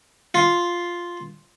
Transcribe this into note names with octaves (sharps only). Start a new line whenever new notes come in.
F4